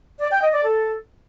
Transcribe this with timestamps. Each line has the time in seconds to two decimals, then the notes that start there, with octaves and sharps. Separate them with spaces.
0.21 D5
0.32 G5
0.43 D#5
0.54 D5
0.65 A4